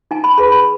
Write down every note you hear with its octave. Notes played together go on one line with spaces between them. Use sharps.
D#4 G#5
B5
G#4 B4 B5
B5